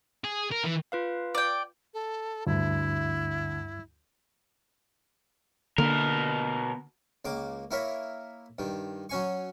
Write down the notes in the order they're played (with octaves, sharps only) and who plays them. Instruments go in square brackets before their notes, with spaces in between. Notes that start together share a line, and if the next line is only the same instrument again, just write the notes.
[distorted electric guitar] G#4
A#4
E3
[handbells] F4 B4 F5
[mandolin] D5 G5
[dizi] A4
[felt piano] D2 [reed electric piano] G2 [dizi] E4
[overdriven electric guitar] B2 A#4 [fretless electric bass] D3 A#3 D4
[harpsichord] C#2 A#3 D6
A#3 E4 A#4 C#5 E5
G2 D#3
F#3 C#4 G#5 C#6